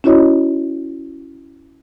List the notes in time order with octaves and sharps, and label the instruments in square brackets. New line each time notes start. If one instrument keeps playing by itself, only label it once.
[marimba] C#4 E4 F#4 C#5 D#5